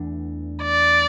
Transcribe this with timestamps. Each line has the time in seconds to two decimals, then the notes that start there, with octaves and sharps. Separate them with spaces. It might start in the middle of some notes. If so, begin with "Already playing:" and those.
Already playing: E2 E3 A3 D4
0.63 D5